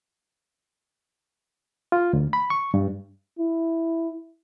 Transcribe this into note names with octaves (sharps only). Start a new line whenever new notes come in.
F4
D2
B5
C#6
G2
E4